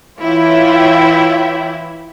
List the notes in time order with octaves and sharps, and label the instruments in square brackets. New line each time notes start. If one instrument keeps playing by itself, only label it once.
[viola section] E3 E4 [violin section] F4 C#5 E5 G5